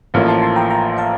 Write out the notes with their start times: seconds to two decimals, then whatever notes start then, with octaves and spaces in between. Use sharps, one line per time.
0.14 A1 A2 F3 A#3 F4
0.28 A5 C6
0.42 A5 C6
0.56 G5 A#5
0.70 G5 A#5
0.98 F5 A5